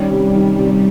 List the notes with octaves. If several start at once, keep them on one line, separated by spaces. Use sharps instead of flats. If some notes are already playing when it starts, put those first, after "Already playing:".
Already playing: D#3 G3 C#4
C3
D#3
C3